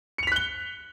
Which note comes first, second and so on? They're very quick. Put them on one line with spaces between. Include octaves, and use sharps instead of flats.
C#7 F7 B6 F#6 G7